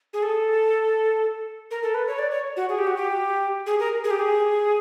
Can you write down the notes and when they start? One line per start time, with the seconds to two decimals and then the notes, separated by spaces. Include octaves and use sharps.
0.13 G#4
0.23 A4
1.71 A#4
1.83 A4
1.94 B4
2.07 C#5
2.19 D5
2.31 C#5
2.56 F#4
2.69 G#4
2.78 G4
2.87 F#4
2.97 G4
3.66 G#4
3.79 A#4
4.04 G#4
4.11 G4
4.19 G#4